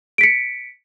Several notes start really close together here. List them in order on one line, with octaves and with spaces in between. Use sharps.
D7 B6 C#7